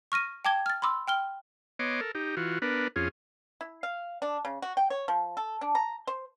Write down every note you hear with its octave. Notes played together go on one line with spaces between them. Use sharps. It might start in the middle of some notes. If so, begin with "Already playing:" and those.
C#6 F6 A#6 D#7
G5 A5 D6 G#6 G7
F6 A6
B5 C6 D6 E6
G5 F6 G7
B3 C#5 D#5 C6 D6
A4 A#4
D#4 G4
E3 F4 F#4
B3 D4 A#4 B4
F2 C#4 F4 G#4
E4
F5
D4
C#3
F#4
G5
C#5
F3
A4
D4
A#5
C5